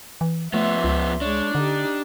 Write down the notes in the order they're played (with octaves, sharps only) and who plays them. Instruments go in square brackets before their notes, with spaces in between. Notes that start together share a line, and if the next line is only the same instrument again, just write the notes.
[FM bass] E3
[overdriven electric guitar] F3 B3 [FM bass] A3 [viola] E5 C6
[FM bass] C#2
[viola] G#3 C#5 [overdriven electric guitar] D4
[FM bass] D3 [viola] D#4 G4